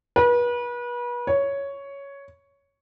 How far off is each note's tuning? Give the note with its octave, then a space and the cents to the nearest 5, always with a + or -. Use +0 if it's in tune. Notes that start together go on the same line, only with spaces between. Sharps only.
B4 -35
C#5 +5